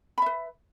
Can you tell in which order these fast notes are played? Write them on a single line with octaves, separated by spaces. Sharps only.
B5 E5 B4